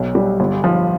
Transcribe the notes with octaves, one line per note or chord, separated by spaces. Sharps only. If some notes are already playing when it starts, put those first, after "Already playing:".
Already playing: B1 F#3
G3
G1
F3